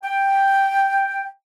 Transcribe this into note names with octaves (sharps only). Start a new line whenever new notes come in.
G5